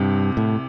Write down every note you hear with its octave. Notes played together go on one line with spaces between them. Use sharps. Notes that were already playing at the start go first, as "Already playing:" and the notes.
Already playing: C2 G2 C3
A2